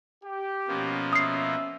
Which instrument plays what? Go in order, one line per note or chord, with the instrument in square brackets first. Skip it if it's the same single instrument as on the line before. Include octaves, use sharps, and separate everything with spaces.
[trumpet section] G4
[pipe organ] B2 F3 A#3 [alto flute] C#4
[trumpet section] E5 [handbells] D#6 C7